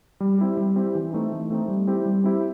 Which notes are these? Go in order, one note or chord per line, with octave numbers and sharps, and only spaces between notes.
G3
C4 E4 G4
G3
C4 E4 G4
E3
A3 C4 D#4
E3
A3 C4 D#4
G3
C4 E4 G4
G3
C4 E4 G4